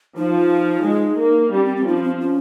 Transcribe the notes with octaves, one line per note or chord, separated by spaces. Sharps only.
F3 D#4
G#3
A#3
G3 C#4
C4
C4
F3 D#4
C#4
C4
C#4